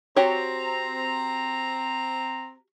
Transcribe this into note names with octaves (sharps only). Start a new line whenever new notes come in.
C4 F#4 G4 C#5 A#5